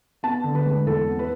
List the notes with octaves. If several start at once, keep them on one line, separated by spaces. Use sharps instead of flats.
B3 A5
D3
B4
G#3
E2 A4
B3
B4